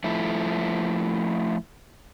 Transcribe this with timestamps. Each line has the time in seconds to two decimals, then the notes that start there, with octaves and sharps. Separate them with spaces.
0.04 F3 A3 E4